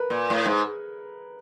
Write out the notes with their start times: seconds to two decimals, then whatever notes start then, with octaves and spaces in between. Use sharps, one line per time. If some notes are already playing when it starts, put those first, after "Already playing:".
Already playing: A#4 B4
0.10 A#2
0.30 A2
0.46 G#2